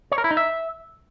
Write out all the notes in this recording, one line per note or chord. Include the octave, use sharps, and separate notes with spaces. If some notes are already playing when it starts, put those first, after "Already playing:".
C#5
A#4
E4
D#4
E5